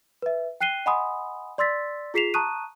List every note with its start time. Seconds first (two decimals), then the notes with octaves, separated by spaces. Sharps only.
0.22 B4 E5
0.61 G5 F#6 C7 D#7 G7
0.86 D#5 F#5 G#5 B5 C6 D#6
1.58 D5 C6 E6 A6 B6
2.14 F4 G#4 B6 C7 E7 F7
2.34 A5 A#5 C#6 D#6 F#6 D#7